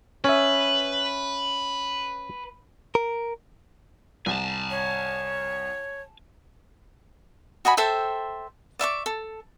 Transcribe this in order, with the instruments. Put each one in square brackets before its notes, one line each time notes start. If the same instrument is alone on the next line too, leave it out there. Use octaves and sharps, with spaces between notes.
[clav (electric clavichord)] C#4 E5 [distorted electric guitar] B4
[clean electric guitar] A#4
[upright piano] C2 [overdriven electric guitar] G#5 A5
[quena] C#5
[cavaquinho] F#4 D#5 G#5 B5
A4 C5 E5 G5
D5 E5 C#6 D6
A4